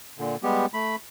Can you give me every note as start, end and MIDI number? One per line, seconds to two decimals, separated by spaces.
0.19 0.36 46
0.19 0.36 50
0.43 0.66 55
0.43 0.66 56
0.43 0.66 59
0.43 0.66 67
0.74 0.96 57
0.74 0.96 83